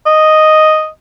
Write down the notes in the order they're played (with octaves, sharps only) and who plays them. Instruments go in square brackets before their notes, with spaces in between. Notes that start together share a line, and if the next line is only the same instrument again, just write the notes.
[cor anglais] D#5